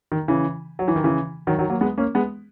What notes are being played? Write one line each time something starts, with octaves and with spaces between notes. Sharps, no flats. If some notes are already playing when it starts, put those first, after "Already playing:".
D#3
C#3 E3
F#3
E3
D#3
C#3 E3
D#3 F#3
D#3 F#3
F#3 A#3
G#3 B3
A#3 C#4
G#3 B3